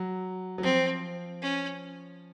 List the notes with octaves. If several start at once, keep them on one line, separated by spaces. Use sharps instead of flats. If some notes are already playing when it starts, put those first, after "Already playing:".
Already playing: F#3
F#3
F3 C4
C#4